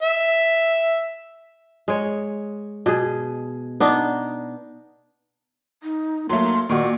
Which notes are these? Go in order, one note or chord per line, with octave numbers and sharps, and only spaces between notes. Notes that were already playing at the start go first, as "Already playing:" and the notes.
E5
G#3 C#5
B2 G#4
B3 D4 D#4
D#4
F#3 A3 A#3 C6
A#2 D#3 F#4 D5 C#6